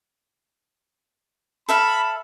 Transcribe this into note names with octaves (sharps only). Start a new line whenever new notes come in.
A4 E5 F5 B5